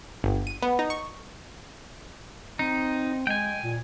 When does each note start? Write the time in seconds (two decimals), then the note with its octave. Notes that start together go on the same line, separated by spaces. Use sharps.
0.24 G1
0.47 D#7
0.63 B3
0.79 D#4
0.90 C#6
2.59 C4 D#4
3.27 G#3 G5 G#5
3.63 A#2